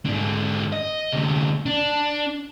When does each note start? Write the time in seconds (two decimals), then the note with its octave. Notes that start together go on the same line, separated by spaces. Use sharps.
0.05 G#2 D3
0.72 D#5
1.12 D2 C3
1.66 D4